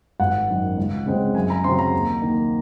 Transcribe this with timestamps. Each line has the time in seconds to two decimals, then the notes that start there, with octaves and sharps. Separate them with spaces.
0.20 G#1 F#5
0.49 F#2 D#3
0.77 C#2
1.06 C#3 G#3 C4
1.35 F#2 G#5
1.50 A#5
1.64 C#3 F#3 C4 C6
1.79 A#5
1.93 D#2
2.22 D#3 A#3